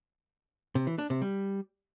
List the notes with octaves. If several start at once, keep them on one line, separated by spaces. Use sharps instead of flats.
C3
E3
D4
C3
G3